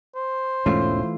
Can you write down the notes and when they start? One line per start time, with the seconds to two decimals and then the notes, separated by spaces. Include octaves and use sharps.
0.15 C5
0.66 E1 G#2 E3 A3 C#4 F4